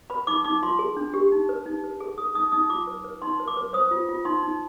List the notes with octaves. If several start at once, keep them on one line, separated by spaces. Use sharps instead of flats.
B4 B5
D#4 D6
D#4 D6
F4 C6
G#4
D4
G4
D#4
B4
D#4
B4
G#4
G#4 D#6
D#4 D#6
D#4 D#6
F4 D6
B4
B4
D#4 C6
B4
D6
B4
C5 D#6
F4
F4
D#4 C6
D#4